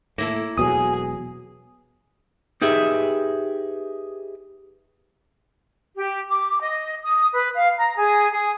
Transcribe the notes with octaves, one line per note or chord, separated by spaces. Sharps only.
A2 A#3 E4 A4
E1 B2 F#3 G#4 D#6
D#4 G4 G#4 B4 E5
G4
D6
D#5
D#6
B4
F5
A#5
G#4
G#4